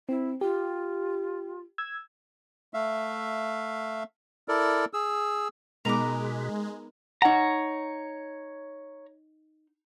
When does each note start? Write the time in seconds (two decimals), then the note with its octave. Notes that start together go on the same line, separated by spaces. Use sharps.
0.09 C4 E4
0.41 F4 G4
1.78 E6 G#6
2.74 A3 E5 F5
4.48 E4 A4 A#4 D5
4.93 G#4 E6
5.85 B2 G#3 B3 D#4 A#4 A#5 D6
7.22 D#4 C#5 F#5 A#5